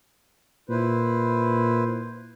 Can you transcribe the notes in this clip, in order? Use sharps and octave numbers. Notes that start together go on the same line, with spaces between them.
A#2 E4 B4 C5